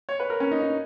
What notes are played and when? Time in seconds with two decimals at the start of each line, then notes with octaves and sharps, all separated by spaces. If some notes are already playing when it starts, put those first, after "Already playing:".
0.09 C#5
0.20 B4
0.30 A#4
0.40 C#4
0.51 D#4
0.62 D#4